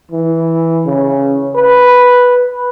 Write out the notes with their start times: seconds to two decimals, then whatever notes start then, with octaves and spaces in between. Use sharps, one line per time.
0.11 E3
0.86 C#3
1.56 B4